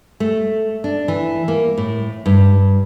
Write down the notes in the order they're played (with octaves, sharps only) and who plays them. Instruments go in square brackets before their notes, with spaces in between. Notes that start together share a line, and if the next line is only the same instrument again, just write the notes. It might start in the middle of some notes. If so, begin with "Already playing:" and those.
[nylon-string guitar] A3
D4
E3
A#3
A2
G2